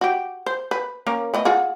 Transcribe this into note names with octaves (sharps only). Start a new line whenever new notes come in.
F#4 G4
C5
B4
A#3 C#4 A#4
A3 B3 D#5
F4 F#4 G#4